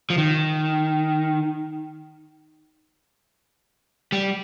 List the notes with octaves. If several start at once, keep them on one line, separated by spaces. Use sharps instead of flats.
F3
D#3
G3